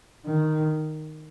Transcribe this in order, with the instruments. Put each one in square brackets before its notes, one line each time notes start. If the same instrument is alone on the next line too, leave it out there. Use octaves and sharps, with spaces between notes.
[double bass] D#3